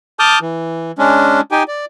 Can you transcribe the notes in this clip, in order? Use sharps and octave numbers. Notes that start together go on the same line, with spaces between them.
A5 D6 D#6 F6 G6
E3
G#3 C#4 D4
D#4 G4 G5 G#5
D5